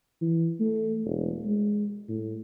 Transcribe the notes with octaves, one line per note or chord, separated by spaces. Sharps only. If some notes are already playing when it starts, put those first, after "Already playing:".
E3
A3
E1
G#3
A2